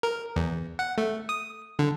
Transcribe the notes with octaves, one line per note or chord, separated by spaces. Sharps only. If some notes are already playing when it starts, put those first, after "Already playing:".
A#4
E2
F#5
A3
D#6
D3